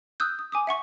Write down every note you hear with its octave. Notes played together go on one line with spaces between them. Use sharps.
D#6 E6 F#6 G6
D#6
G#5 D6 D#6
E5 F#5 C#6